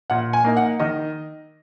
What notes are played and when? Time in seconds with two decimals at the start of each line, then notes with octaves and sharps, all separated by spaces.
0.10 A#2 F#5
0.33 G#5
0.44 A#3 D#4
0.57 F#5
0.80 D#3 D#5